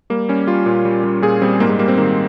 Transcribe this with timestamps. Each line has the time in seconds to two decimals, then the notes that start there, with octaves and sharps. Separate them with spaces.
0.10 G3 A#3
0.29 G3 C#4
0.47 G3 F4
0.66 A#2
0.85 G3
1.04 G3
1.22 A#2 G#4
1.42 G3 C4
1.60 G#2 A#3
1.70 G#3
1.79 G3 A#3
1.88 C4
1.98 D#3 A#3